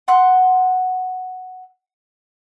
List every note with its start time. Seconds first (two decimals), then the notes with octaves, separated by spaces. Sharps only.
0.08 F#5 C6 F#6